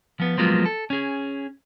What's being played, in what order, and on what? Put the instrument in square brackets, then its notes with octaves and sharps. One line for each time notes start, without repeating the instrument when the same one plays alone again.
[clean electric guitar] F3 B3
F3 F#3 G#3 A#3 B3 F4
A4
C#4 G#4